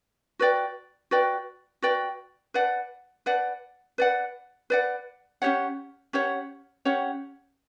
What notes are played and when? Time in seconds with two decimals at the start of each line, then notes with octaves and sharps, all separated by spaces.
0.39 F#4 B4 D5 G5
1.11 F#4 B4 D5 G5
1.82 F#4 B4 D5 G5
2.54 B4 D5 F#5
3.26 B4 D5 F#5
3.98 B4 D5 F#5
4.70 B4 D5 F#5
5.42 C#4 G4 C#5 F#5
6.13 C#4 G4 C#5 F#5
6.85 C#4 G4 C#5 F#5